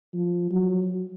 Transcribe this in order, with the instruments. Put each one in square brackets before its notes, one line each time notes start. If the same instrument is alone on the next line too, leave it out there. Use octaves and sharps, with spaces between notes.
[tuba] F3
F#3